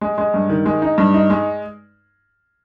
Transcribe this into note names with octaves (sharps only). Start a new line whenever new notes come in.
G#3
G#3
G2
D#3
G#3
D#4
G2
D#4
G#3